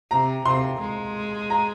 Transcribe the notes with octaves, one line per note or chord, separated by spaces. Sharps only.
C3 A#5
C3 C6
G#3
A#5